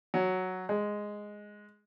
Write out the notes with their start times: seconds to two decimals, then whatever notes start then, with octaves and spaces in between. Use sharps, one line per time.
0.14 F#3
0.69 G#3